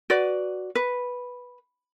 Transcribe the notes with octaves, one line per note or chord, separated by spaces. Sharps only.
F#4 B4 D5
B4